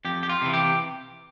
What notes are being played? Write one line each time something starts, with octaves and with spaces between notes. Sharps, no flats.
F2 G4
G4
F4
C3 E3
G4